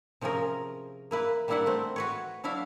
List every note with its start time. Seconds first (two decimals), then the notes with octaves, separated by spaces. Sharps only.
0.21 C3 F3 C#4 G#4 A#4
1.11 A#3 E4 B4
1.48 G3 A#3 D4 E4 E5 F#5
1.66 A3 C4
1.96 F#4 B4 C#5
2.44 F#3 D4 E4 E5 F5